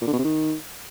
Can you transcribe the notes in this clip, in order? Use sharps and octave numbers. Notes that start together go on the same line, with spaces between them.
A#2
D3
B2
C3
D#3